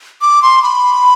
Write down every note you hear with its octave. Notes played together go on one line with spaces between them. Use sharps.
D6
C6
B5